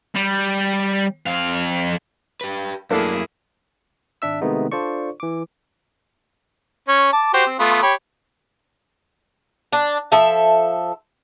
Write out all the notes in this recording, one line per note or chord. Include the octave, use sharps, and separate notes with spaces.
G3
F2 F5
G4 B4
F#2 A3 A#3 D4 E4 G#4 A4 F5
G#1 D4 E5 E6
C3 D#3 G#3 A3 B3 D#4
D4 F4 A4 C5 D5 C#6
E3 D6
C#4 C#5
A5 D6
F#4 G4 C5
C4
A3 B3 F4
G4 C#5 B5
D4
F3 A4 E5